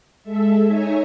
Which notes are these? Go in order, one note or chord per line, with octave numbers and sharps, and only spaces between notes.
G#3 A4 E5
D#4 C#5 E5 G#5 A#5